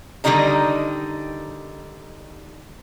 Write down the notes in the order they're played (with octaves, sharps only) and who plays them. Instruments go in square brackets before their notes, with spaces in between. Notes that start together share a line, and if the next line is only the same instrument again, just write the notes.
[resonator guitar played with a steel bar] D3 D#3 G3 D#4 D#5 A#5